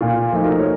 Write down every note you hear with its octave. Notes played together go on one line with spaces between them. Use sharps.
A#2 F4
F3 A3 D#4
F#4 A#4
C#5